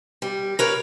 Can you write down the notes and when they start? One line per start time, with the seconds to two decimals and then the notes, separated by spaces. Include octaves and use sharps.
0.22 G3
0.59 A#4 B4 C#5